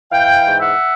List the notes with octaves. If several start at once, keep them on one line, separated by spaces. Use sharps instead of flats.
E3 F5 G5
G#2
E5 F#5